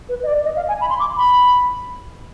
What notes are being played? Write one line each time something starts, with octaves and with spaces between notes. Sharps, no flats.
B4
D#5
D5
D#5
F5
G#5
B5
C6
D6
B5